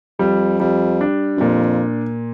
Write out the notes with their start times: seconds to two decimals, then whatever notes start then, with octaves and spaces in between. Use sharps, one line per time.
0.19 F2 G3
0.60 F2 G3
1.01 D4
1.37 F#2
1.41 F2 A#2